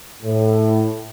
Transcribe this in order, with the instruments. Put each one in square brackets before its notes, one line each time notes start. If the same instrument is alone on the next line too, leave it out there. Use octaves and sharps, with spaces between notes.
[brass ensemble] A2